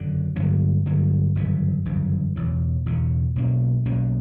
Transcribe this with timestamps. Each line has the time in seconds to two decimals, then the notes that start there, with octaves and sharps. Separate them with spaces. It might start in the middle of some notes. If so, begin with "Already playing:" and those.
Already playing: F#1 F#2 D3
0.36 G2 D3 F#3 A#3
0.86 G2 D3 F#3 A#3
1.35 G1 F#2 C#3 E3
1.85 G1 F#2 C#3 E3
2.36 E1 E2 C#3
2.85 E1 E2 C#3
3.35 B1 B2 A#3 C#4
3.85 B1 B2 A#3 C#4